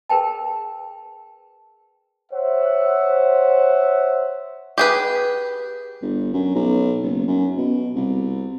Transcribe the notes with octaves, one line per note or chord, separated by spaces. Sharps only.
G#4 A#4 B4 G5 A5
C5 C#5 E5 F#5
G4 G#4 B4
G1
F#2
B1
F#1
F#2
B2
C2